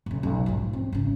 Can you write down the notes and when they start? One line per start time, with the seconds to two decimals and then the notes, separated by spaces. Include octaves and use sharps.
0.06 B1 C#3
0.23 B1
0.46 G#2 F3
0.73 C4
0.93 G#1 C#3